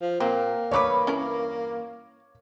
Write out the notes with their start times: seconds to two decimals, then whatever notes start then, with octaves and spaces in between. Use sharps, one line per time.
0.01 F3
0.20 A#2 A#3 C4
0.71 E2 G2 B4 C#5 C#6 D6
1.07 C#4 E4 A#4